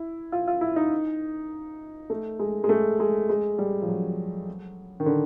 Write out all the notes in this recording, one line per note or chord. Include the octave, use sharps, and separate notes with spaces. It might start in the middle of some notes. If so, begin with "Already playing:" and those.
Already playing: E4
F4
F4
E4
D#4
A3
G#3
G#3
A3
G#3
G#3
G3
F3
F#3
D#3
D3